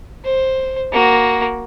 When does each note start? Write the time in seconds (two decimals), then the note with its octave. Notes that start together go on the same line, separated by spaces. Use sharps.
0.25 C5
0.92 A#3 F#4